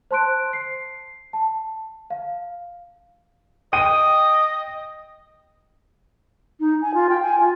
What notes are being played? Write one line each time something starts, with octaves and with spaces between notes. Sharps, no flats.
C5 A5 C6 F#6 D7
C7
A5
F5
D#5 G5 D#7
D#4
G#5
F4
G5
G#5
F4